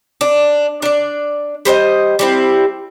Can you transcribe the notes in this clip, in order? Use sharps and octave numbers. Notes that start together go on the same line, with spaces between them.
D4
D4 D5
G3 C5 C#5 D#5
G3 C4 E4